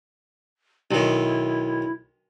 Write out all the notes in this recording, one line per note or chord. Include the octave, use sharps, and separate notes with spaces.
B1 D#3 E4